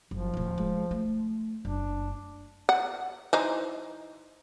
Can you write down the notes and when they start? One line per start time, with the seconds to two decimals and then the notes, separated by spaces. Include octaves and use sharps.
0.11 F#1 F3
0.34 D1 F4
0.58 G#3
0.91 A3
1.65 F#1 D4
2.69 F#5
3.33 E3 D#4 C5